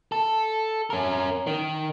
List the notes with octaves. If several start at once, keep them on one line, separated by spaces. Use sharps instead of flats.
A4
C#4 A#4
D#3